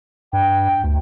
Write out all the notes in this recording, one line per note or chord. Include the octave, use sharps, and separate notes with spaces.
G2 G5
D2